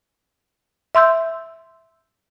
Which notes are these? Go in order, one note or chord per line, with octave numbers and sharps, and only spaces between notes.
E5 C6 E6 G6